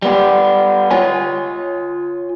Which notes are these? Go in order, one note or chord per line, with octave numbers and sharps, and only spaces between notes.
G3 B3 G4
F4 C#5 G#5